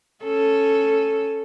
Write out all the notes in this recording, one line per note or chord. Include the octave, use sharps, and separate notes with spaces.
C#4 A4